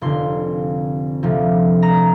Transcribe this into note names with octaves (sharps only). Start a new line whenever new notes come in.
F1 F2 D3 C6
D2 C3 F3
A#5